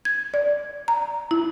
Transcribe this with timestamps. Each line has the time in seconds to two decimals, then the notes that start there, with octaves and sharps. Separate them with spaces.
0.05 G#6
0.34 D5
0.88 A#5
1.31 E4